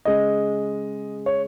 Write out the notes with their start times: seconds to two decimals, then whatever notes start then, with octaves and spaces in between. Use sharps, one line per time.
0.05 C#3 G#3 D#5
1.26 C#5